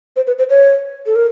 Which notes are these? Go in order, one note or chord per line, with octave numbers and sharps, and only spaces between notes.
C5
B4
C5
C#5
A4
A#4